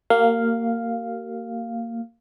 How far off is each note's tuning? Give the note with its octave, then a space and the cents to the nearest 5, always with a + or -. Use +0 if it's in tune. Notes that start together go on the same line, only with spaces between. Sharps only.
A#3 -20 G4 -45 F5 +0